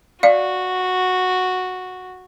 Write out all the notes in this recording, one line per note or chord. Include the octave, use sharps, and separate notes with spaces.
F#4 D5 F5